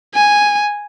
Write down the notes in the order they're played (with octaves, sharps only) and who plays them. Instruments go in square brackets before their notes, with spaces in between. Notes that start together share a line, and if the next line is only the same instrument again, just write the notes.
[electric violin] G#5